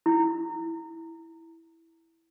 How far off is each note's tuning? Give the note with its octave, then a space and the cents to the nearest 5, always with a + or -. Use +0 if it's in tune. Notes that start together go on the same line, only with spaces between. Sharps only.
E4 -5